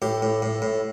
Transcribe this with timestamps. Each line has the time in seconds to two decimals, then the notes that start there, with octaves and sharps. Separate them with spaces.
0.02 A2 G4
0.22 A2
0.42 A2
0.62 A2